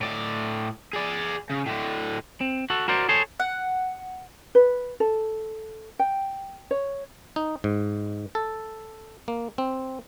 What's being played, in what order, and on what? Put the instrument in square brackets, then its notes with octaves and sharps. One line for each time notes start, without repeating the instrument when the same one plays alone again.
[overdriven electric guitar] A2 D5
G#4 D5
C#3
A2 D3
[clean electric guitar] C4
F#4 A4
F#4 A#4 C5 D5
G#4 A4 C5 C#5
[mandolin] F#5
[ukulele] B4
A4
G5
C#5
[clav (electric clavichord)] D#4
G#2
A4
A#3
C4